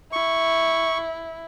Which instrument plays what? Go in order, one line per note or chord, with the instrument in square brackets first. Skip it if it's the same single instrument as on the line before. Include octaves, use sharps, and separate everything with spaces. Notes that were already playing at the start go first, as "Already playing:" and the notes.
[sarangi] E4 [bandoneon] C#6